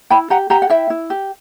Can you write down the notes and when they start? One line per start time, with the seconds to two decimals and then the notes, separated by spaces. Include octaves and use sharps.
0.10 E4 G5 B5
0.30 G4 F#5 A#5
0.50 G4 F#5 A#5
0.62 F#5
0.70 E4 E5 G5
0.90 E4
1.10 G4